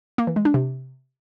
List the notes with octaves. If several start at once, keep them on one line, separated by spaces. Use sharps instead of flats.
A#3
E3
G#3
D4
C3